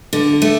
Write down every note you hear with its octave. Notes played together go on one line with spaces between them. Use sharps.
D3
A3